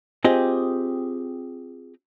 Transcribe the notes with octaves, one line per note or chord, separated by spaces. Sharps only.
C4 F4 G4 G#4 D#5